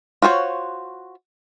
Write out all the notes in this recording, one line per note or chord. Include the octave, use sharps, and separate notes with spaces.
F4 F#4 C5 C#5